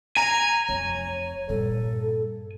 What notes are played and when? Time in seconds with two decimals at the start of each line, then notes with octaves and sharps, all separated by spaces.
0.17 G#5 A#5
0.69 F1 F2 C#5
1.49 G2 A#2 A4